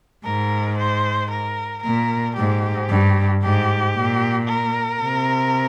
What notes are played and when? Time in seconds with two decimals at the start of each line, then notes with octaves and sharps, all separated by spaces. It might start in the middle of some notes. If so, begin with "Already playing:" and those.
0.24 G#2 A#4
0.78 C5
1.30 A#4
1.83 A#2 A#4
2.36 G#2 G4
2.88 G2
3.42 G#2 G4
3.94 A#2
4.48 A#4
5.00 C3